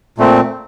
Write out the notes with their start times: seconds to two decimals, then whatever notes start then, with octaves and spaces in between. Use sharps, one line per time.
0.18 A#2 A3 C4